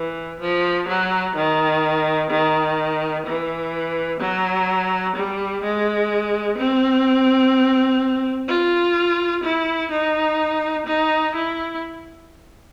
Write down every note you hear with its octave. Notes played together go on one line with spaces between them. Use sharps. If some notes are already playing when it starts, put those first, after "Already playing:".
Already playing: E3
F3
F#3
D#3
D#3
E3
F#3
G3
G#3
C4
F4
E4
D#4
D#4
E4